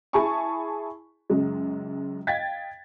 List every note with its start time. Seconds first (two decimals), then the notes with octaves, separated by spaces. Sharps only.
0.13 E4 G#4 G#5 A5 B5 C#6
1.30 C#2 F#2 G#3
2.27 D#5 F5 G5 G#6 A6 B6